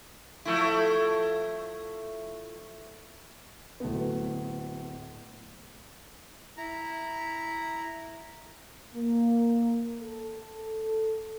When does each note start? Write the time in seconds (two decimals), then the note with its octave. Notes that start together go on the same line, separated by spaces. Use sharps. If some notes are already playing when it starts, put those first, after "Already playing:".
0.45 F3 A3 E4
3.80 D1 A3 B3
6.57 E4 A#5
8.94 A#3
10.03 A4